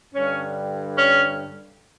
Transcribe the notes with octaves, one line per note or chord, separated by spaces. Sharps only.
G2 D3 G3 C#4
C#4